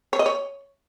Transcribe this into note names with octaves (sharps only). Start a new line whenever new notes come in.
C#5
D#5
C#5